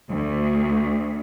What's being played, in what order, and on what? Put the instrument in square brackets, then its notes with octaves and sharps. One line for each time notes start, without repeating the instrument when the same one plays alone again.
[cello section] D2